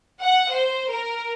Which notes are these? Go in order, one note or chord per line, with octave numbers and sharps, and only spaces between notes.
F#5
C5
A#4